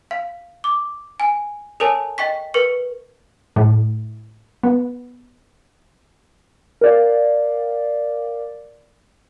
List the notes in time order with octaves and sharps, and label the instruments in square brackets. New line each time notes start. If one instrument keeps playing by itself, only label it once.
[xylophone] F5
D6
G#5
A4 A#4 C#5 G#5 A5
D#5 G5 C#6 B6
A#4 B4 C#6 C#7
[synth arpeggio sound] A2
B3
[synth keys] A#4 D5 F5